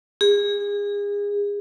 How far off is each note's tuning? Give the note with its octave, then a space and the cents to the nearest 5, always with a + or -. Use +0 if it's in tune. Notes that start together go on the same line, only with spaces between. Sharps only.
G#4 -30